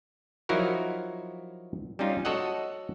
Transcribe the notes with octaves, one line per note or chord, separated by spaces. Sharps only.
F3 F#3 D#4 E4 F#4 A#4
G3 C#4 D#4 F4
F#4 A4 C#5 D#5 F#5